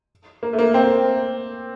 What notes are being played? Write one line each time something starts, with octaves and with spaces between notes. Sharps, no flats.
A#3
A3
A#3
C4